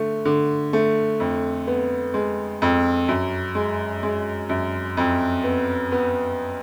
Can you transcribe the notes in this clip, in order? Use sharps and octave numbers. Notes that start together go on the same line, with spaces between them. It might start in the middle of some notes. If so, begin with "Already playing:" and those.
Already playing: D3 A3
D3
A3
F2
B3
G#3
F2
F#2
G#3
G#3
F#2
F2
B3
B3